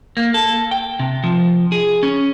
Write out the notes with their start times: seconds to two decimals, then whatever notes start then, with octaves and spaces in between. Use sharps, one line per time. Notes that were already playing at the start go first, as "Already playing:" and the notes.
0.17 A#3
0.34 A4
0.71 G5
1.00 C3
1.24 F3
1.72 G#4
2.03 C#4